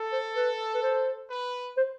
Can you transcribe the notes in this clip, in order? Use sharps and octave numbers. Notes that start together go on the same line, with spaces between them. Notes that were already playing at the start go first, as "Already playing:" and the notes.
Already playing: A4
C5
B4
B4
C5
B4
C5